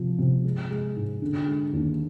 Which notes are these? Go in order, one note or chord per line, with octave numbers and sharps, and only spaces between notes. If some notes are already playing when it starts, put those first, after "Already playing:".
Already playing: C3 F3
C3
G#3
G#3
G#2
D3
G#3
D#2